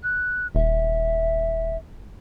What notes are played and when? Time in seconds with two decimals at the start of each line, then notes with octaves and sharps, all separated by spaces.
0.03 F#6
0.55 D#1 E5